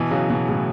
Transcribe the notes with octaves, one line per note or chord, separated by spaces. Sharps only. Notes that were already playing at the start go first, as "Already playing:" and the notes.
Already playing: B2 E3
C#3 F#3
B2 E3
A2 C#3